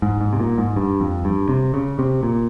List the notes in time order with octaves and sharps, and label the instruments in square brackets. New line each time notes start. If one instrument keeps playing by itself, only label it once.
[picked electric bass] G#2
G#2
C3
A#2
G#2
G2
F2
G2
C3
C#3
C3
A#2